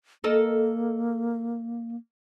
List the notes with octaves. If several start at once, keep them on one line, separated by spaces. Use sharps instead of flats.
A#3 A4 A#4 D#5